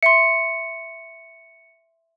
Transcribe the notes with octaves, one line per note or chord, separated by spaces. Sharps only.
E5 C6 C#7